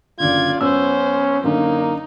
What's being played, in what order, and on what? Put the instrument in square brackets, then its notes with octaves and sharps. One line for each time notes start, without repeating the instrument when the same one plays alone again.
[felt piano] F#1 D3 [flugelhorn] F4 [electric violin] D5 G#6
[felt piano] F#2 E6 [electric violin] B3 C5 [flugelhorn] C#4
[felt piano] F#2 D3 [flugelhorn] A#3 [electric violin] D#4